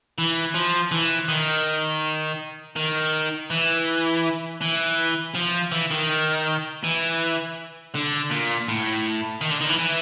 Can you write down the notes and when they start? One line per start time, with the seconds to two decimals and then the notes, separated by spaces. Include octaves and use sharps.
0.18 E3
0.55 F3
0.92 E3
1.28 D#3
2.76 D#3
3.51 E3
4.61 E3
5.35 F3
5.72 E3
5.91 D#3
6.84 E3
7.94 D3
8.30 A#2
8.68 A2
9.41 D#3
9.51 D3
9.61 D#3
9.69 E3
9.79 E3